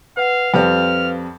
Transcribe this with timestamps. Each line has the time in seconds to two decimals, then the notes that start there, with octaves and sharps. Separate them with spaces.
0.17 B4 F5 F#5
0.54 F2 G3 C4 B4 F5 F6